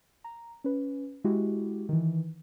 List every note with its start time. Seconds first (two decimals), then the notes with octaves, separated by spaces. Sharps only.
0.24 A#5
0.64 C#4 B4
1.24 G#3 E4 F#4 G4
1.89 D#3 E3